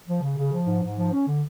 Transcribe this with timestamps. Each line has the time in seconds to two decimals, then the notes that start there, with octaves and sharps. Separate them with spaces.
0.07 F3
0.21 C#3
0.37 C#3
0.52 F3
0.67 G#2
0.81 G#2
0.96 F3
1.12 C#4
1.26 D3